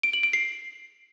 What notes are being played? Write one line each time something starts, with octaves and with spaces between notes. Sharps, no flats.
D7
F#7
D7
C7